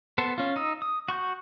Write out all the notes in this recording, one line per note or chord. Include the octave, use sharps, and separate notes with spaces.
B3 A4 C5
C#4 F4
D#4 D#6 E6
D#6
F#4 C#6 G6